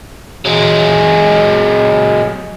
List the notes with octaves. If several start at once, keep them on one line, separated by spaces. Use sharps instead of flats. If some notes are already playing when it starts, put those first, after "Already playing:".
F#3 G#3